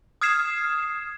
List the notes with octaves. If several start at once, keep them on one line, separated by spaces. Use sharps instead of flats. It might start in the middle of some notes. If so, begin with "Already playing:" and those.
D#6 F6 G#6 C7 E7